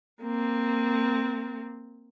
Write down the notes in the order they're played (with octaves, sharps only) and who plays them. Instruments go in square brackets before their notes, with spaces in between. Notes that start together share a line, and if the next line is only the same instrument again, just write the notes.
[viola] A#3 C4